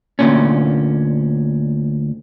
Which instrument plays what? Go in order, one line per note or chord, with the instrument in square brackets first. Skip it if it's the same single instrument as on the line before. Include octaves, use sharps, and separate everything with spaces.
[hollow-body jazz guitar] D2 G2 A#2 C#4